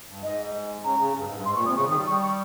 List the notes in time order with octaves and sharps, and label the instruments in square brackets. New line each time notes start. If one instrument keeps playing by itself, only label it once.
[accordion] G2
[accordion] G#2 [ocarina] D#5
[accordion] C#3 [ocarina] A#5
[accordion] C#3
G2
G#2
G2
[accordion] G#2 [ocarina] C6
[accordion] A#2 [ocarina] C#6
[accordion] C3 [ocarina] D#6
[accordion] C#3 [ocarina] C#6
[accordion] D#3
[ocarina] D#6
[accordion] G3
[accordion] G3 [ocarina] C#6
[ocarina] C#6